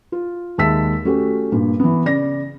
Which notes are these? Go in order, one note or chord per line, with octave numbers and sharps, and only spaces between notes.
F4
D#2 G#3 E5 A5 E6 B6
A3 C#4 F#4 G4
G2 A#2
E3 B3
C#3 D5 A#6